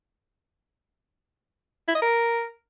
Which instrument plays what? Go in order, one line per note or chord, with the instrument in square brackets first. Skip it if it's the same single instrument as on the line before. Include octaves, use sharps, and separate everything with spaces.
[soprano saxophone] E4
D#5
A#4